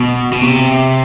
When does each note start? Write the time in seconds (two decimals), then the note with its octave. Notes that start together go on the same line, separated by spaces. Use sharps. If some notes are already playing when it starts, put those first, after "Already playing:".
Already playing: B2
0.33 B2
0.42 C3